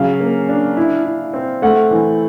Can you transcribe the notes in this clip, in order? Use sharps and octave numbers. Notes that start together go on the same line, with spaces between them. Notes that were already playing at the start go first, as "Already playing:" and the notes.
Already playing: C#3 F#3 F5
A#3
D4
E4
E4
C4
A3 F#5
E3